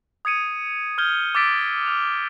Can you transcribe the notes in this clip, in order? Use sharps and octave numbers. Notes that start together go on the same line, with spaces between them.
D#6 G#6 C#7 D#7
D#6 F6 G6 G#6 G7
D6 E6 A6 B6 D7
F6 F7